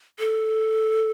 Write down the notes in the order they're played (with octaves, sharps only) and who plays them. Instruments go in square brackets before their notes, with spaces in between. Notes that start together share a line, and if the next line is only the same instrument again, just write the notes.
[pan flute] A4